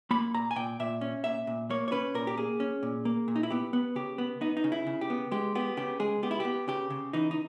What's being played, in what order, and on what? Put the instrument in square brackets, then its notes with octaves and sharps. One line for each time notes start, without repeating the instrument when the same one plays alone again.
[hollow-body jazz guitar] A#3 B5
A#2 A#5
G#5
A#2 G5
A#2 E5
C#4
A#2 E5
A#2
A#3 C#5
C#5
C#4 B4
A#2 A#4
G4
A#3 G#4
C#4
A#2
A#3
A#2
D#4
E4
B3 G4
B3
C#3 G4
B3
B3 D#4
D#4
C#3
E4
C#3
G4
B3
G#3 G4
B3 G4
C#3 G4
G#3 G#4
B3 G4
E4
B3 G4
C#3 G4
C#3
E3 D#4
D#4